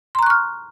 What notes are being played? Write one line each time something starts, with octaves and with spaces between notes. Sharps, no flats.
A#5 C6 C#6 F6 F#6